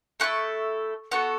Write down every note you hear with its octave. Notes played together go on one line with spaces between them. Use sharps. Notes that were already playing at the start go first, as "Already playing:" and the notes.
A3 E4 A4 C#6 F#6
B3 F#4 A4 C#6 F#6